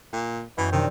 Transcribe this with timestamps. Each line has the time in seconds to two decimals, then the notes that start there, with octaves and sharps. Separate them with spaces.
0.13 A#2
0.58 F#2 B2 E3 G6
0.72 C3 D#3 E3 C4 D4